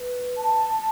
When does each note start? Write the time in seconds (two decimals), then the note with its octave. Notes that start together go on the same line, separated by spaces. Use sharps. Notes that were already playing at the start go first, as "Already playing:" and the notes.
Already playing: B4
0.37 A5